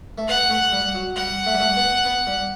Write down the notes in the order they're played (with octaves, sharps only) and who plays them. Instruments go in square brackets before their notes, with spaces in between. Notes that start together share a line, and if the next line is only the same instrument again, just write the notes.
[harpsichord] A3
[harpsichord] B3 [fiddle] F#5
[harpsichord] A3
G3
F#3
[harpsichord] G3 [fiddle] F#5
[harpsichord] A3
G3
A3
B3
B3
G3